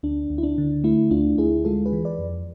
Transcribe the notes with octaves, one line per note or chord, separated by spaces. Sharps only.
D2 D4
D2
E4
D4
D3
A3 E4
D2 D4 F4
D2 E4 G#4
G#3 F4 A4
G#4 B4
E3
B4 D5
F2